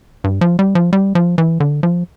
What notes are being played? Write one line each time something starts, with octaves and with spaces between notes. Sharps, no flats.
G2
F3
G3
F3
G3
F3
E3
D3
F3